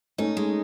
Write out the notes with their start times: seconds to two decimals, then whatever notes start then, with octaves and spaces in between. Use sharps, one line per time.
0.18 A3 C#4 D#4
0.37 G#3